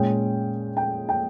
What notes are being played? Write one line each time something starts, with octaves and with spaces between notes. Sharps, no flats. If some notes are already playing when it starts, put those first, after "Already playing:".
Already playing: A#2 G#3 C#4 G5
G5
G5